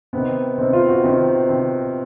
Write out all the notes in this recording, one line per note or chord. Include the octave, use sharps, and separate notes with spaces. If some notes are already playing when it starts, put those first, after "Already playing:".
C3 D#3 B3
C3 D#3 C4
F4
F#4
C3 D#3
C3 D#3